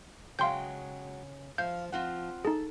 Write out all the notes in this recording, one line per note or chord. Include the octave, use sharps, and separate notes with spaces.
C#3 F#3 G#3 F5 G5 C6 G6
F3 F5 G6
F3 C4 F4 F#5
D#4 G#4 A4